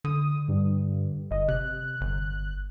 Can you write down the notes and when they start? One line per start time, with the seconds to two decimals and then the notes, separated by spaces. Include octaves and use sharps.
0.04 D3 D#6
0.48 G2
1.31 G1 D#5
1.48 C3 F#6
2.01 G1